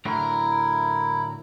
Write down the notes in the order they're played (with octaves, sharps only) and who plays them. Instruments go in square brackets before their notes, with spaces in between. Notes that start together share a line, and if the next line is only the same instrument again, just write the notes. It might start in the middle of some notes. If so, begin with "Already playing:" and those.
[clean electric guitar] A2 D3 F#3 [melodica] E4 [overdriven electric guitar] A#4